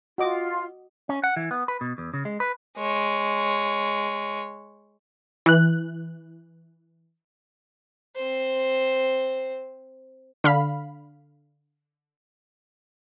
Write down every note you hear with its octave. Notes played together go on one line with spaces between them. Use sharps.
F4 F#4 D#5 D6
C#4
F#5
E3
B3
B4
B2
E2
C#3
G#3
B4
G#3 C#5
E3 F#6
C4 C5
D3 F5 B5